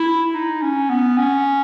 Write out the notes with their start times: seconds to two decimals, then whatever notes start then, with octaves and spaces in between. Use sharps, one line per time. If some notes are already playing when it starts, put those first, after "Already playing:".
Already playing: E4
0.34 D#4
0.62 C#4
0.90 B3
1.18 C#4